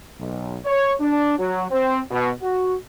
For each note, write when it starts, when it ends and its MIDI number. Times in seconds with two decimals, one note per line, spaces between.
0.19 0.57 35
0.65 0.93 73
1.00 1.38 62
1.39 1.65 54
1.71 1.99 60
2.11 2.30 47
2.42 2.75 66